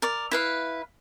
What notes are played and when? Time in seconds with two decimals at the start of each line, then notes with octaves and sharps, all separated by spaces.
0.02 A#4 D5
0.31 E4 B4 F5